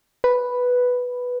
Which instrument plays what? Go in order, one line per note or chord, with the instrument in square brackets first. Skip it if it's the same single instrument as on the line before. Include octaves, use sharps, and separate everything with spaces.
[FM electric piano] B4